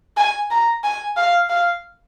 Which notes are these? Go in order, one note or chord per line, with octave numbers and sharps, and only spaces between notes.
G#5
A#5
G#5
F5
F5